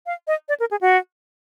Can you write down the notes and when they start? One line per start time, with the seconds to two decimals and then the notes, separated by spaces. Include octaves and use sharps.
0.06 F5
0.27 D#5
0.49 D5
0.60 A#4
0.71 G#4
0.81 F#4